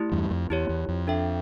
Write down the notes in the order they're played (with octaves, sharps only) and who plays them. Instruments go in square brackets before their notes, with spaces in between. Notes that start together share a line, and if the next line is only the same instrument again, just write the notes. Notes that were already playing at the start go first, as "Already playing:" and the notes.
Already playing: [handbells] A3 E4 G4
[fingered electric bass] E2 G2
F2
[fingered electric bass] E2 [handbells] E4 G4 C#5
[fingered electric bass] E2
F2
[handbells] D4 A4 E5 G5